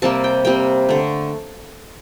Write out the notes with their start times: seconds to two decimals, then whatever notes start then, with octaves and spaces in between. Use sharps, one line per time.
0.02 C3 G3 A#3 A5
0.24 G5
0.45 C3 G3 A#3 G5
0.89 D3 A3